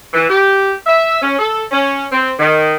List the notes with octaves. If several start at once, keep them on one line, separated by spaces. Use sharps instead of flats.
E3
G4
E5
C#4
A4
C#4
C4
D#3